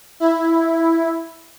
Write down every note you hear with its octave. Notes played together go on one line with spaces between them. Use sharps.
E4